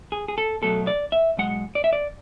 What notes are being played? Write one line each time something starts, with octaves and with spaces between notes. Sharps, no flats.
G#4
G#4
A4
B1 B2 F#3 A3 A4
D5
E5
B1 B2 G#3 F#5
D5
E5
D5